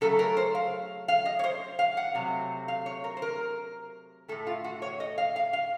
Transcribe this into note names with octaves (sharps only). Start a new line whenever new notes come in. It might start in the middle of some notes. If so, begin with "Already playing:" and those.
C#3 F#3 A3 A4
A#4
C5
F5
F5
D#5
C#5
C5
F5
F#5
C3 F#3 A3
F5
C#5
A#4
C5
A#4
A2 A3 A4
F4
F#4
C#5
D#5
F5
F5
F5